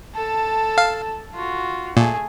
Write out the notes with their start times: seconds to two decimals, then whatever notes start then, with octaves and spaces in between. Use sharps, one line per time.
0.15 A4 A5
0.78 F5
1.34 F4 F#4
1.97 A#2 A3 G#4